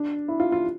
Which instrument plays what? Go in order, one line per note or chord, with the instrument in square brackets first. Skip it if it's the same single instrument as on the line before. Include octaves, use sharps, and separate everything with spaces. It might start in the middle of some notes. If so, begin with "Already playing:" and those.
Already playing: [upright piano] D4
E4
F4
F4